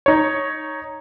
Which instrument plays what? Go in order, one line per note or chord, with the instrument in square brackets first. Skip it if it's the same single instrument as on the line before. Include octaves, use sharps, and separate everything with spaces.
[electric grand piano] D#4 C#5